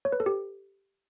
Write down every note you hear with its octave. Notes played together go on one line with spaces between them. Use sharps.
C#5
B4
A4
G4